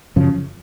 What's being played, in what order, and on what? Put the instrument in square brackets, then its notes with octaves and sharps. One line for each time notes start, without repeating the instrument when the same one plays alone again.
[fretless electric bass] F#2 C#3 F3